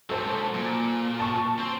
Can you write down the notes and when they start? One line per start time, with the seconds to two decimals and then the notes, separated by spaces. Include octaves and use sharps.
0.09 G#2 F#3 A4 C5 A5
0.54 A#2
1.20 A5 C#6
1.59 C4 C5